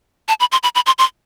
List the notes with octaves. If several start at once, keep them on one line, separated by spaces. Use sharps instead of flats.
A5
B5
C6
B5
B5
C6
C6